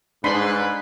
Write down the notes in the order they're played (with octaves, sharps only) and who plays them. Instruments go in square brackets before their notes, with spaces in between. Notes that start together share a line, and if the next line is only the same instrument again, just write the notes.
[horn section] G#2 B4 [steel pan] D4 B5 C6